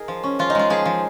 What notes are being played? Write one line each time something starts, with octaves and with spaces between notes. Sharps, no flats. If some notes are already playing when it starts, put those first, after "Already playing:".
Already playing: D#4 G#4 A#4
F3
C#4
F3 F4
D#4
G#3 F4
F3 G#4
F3